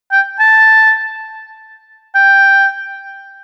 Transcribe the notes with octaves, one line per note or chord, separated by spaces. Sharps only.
G5
A5
G5